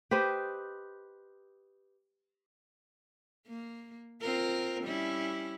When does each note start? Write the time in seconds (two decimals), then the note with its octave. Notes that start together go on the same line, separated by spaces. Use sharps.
0.11 G4 B4 C5 D#5
3.47 A#3
4.21 C4 F4 A#4
4.84 G3 C#4 E4